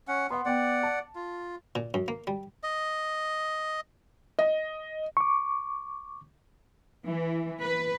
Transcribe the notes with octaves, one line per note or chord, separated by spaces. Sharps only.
C#4 F#5
B3 F#5 C6
B3 D5 F#5 G5
A5
F4
A#2
F#2
A#3
G3
D#5
D#5
C#6 D6
E3
B4